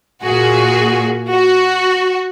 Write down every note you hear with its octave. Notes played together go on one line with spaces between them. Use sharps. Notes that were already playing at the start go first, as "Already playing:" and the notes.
A#2 F#4 G#4
F#4